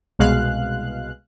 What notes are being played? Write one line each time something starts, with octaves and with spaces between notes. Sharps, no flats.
C2 B2 G#3 F5 F#6